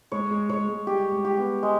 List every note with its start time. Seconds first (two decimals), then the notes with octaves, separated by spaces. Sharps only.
0.12 G#3 C#5
0.31 G#3
0.49 G#3 C#5
0.69 G#3
0.87 G3 G4
1.12 G#3
1.25 G4
1.37 B3
1.63 G#3